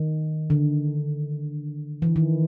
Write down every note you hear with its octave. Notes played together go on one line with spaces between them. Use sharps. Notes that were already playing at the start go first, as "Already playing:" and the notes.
Already playing: D#3
D3
E3
D#3